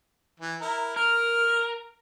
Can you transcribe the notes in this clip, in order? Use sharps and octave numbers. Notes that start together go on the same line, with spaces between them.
E3
E4 A#4
A#4 F6